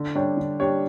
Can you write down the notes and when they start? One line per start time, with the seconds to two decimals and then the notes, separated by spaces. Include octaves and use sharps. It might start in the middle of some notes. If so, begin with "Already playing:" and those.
Already playing: D3
0.15 G3 D4 G4 C#5
0.37 D3
0.60 G3 D4 G4 C#5